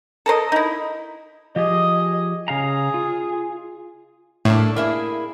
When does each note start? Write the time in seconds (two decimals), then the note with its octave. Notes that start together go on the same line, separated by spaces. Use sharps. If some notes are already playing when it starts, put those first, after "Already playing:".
0.26 A4 A#4 C5 D#5
0.52 D#4 E4
1.56 F3 G4 G#4 D#5
2.48 C#3 G#4 F5 A#5
2.94 F4
4.45 A2 A3 A#3 D4
4.76 A#3 E4 G#4